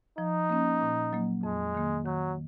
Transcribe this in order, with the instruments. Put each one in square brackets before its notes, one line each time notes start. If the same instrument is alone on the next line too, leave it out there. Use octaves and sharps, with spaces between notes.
[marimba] F3 [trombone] D#4
[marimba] A#3 C#4
A#2
F#3 A#3
[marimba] F2 [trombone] G#3
[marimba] D#3 A#3
[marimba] D#3 [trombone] F#3